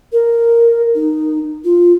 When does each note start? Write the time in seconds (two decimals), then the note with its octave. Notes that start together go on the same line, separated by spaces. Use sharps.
0.13 A#4
0.95 D#4
1.65 F4